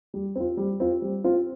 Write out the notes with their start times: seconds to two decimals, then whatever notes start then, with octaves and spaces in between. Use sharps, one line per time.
0.14 G3
0.35 C4 F4
0.57 G3
0.80 C4 F4
1.02 G3
1.24 C4 F4